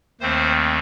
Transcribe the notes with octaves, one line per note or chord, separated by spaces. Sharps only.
D#2 D#3 A3 C4 C5